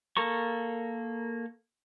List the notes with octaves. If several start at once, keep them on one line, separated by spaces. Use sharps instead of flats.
A#3 A4 A#4 C#6